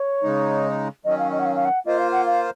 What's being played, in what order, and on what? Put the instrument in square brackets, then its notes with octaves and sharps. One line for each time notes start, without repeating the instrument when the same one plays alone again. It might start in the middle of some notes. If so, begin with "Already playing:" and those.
Already playing: [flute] C#5
[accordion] C#3 G#3 D#4
[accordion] D#3 F#3 C#4 [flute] D#5
[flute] F5
D#5
F#5
F5
F5
F#5
[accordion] A#3 F4 C5 [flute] D#5
[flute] F5
F#5
F5